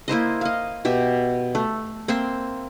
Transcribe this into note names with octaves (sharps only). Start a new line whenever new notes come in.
A#3 E4 C5 D#5
D#5 F5
B2 G4 E5
A3
A#3 C4 E5 C6